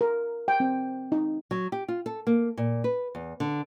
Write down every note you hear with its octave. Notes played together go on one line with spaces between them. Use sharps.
A#4
G5
C4
D#4
F#3
G4
F4
A4
A#3
A#2
B4
E2
D3